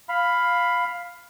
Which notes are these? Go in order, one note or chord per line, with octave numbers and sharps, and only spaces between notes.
F5 B5